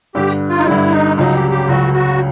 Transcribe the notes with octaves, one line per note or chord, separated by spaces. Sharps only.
G2 D3 G3 G4
F4
D#4
G2 D3 G3 E4
D#4
C#2 C#3 F#3 D#4
G4
G4
C#2 C#3 F#3 F#4
F#4